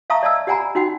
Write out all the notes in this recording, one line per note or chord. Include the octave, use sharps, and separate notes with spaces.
E5 F5 A5 A#5 C#6 D#6
D5 D#5 A5 E6
G4 D5 F#5 G#5 A#5 B5
D#4 F#4 F#5 G5